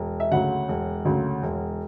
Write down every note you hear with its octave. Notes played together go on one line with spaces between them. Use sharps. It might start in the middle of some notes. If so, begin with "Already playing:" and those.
Already playing: E1
E5
D2 C#3 F#3 F#5
E1
D2 C#3 F#3
E1